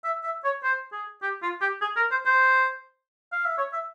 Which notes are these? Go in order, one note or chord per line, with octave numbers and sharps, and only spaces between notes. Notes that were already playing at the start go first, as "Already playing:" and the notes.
E5
E5
C#5
C5
G#4
G4
F4
G4
G#4
A#4
C5
C5
F5
E5
C#5
E5